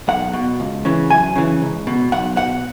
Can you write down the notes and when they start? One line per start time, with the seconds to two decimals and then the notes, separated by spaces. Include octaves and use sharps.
0.08 B1 F#5
0.33 B2
0.60 C#2
0.85 C#3 E3
1.10 F#2 G#5
1.36 C#3 E3
1.62 C#2
1.87 B2
2.12 B1 F#5
2.37 B2 F#5